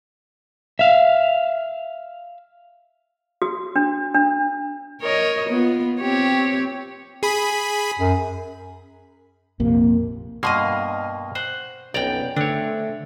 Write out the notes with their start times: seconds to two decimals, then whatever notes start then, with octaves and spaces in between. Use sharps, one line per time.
0.79 E5 F5
3.42 F#4
3.76 D4
4.14 D4
5.02 A#4 C#5 D#5
5.49 B3 F4
6.01 C4 G4 C#5
7.23 G#4 B5
7.99 F#2
9.60 A#1 F2 C3 A#3
10.43 G2 B2 A#3 D#5 F5 C6
11.35 C5 F#5
11.94 B1 F2 B3 C#4 D5 G5 A#5 G6
12.37 D3 A3 C4 D4 C#5